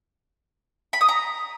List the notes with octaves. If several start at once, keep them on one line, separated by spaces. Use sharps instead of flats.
B5
D#6
A#5